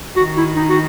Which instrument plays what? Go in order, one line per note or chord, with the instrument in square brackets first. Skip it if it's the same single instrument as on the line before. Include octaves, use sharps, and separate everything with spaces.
[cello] D#3 [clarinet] F#4
[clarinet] E4
D#4
F#4